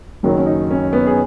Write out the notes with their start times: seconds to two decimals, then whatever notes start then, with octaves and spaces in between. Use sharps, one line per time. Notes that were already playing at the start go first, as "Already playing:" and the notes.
0.23 F#1 F#2 D#3 F#3
0.37 C#4
0.46 D#4
0.71 C#4
0.93 B3
1.07 G#4